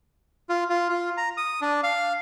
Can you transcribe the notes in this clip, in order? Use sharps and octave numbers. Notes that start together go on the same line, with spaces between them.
F4
F4
F4
A#5
D#6
D4
F5